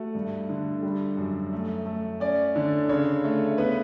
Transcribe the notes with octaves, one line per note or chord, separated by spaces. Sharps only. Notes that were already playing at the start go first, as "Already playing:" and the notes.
Already playing: A3 F#4
G2
D3
G3
F#2
A3
A3
C#4 D5
D3
C#3 C#5
A3
B3 B4